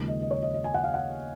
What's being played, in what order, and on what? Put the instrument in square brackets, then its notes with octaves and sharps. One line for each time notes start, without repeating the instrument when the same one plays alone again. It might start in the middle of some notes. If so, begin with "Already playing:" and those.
Already playing: [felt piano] D#2 C#3 F3 G#3
D#5
D#5
C#5
D#5
D#5
G#5
F#5
F5
F#5